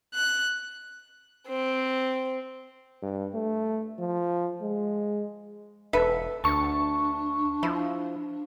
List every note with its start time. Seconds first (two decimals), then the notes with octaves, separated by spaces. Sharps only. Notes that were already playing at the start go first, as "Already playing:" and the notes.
0.14 F#6
1.48 C4
3.02 G2
3.34 A3
3.99 F3
4.62 G#3
5.93 E1 A4 B4 E5
6.44 D2 D4 A5 C#6
7.63 F3 E4